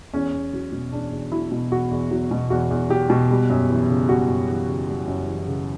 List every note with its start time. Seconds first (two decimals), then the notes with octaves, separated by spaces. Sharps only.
0.13 E2 C#4
0.33 E2
0.53 F#3
0.72 B2
0.92 E2 D4
1.12 E2
1.32 F#3 E4
1.52 B2
1.72 E2 F#4
1.91 E2
2.11 F#3
2.31 B2
2.50 E2 F#4
2.71 E2
2.90 F#3 G4
3.10 B2
3.30 G3
3.50 F#2
3.70 E3
3.89 C#3
4.09 G3 F#4
4.29 F#2
4.49 E3
4.68 C#3
4.88 G3
5.08 F#2
5.28 E3
5.47 C#3